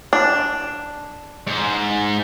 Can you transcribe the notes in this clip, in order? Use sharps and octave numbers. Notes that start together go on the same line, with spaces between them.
D4
G#2